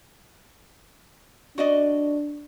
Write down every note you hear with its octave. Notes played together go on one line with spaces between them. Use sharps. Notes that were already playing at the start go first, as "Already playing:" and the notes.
D4 F#4 D5 D#5